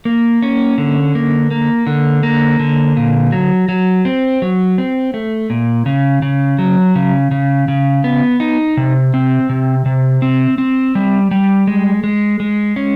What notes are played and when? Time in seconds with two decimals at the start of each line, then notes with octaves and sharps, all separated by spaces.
0.05 A#3
0.42 C#4
0.78 D3
1.15 A#3
1.51 A#3
1.87 D3
2.23 A#3
2.59 D3
2.97 A#2
3.32 F#3
3.69 F#3
4.05 C4
4.42 F#3
4.78 C4
5.14 A3
5.50 A#2
5.86 C#3
6.22 C#3
6.58 F#3
6.95 C#3
7.31 C#3
7.68 C#3
8.04 B3
8.40 D#4
8.77 C3
9.14 C4
9.49 C3
9.86 C3
10.22 C4
10.58 C4
10.95 G3
11.31 G3
11.67 G#3
12.04 G#3
12.40 G#3
12.76 C#4